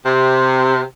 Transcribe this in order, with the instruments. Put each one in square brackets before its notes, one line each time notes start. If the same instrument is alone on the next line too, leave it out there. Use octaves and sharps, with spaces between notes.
[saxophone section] C3